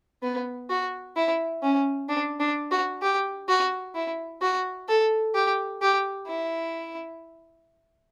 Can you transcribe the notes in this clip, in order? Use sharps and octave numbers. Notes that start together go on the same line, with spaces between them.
B3
F#4
E4
C#4
D4
D4
F#4
G4
F#4
E4
F#4
A4
G4
G4
E4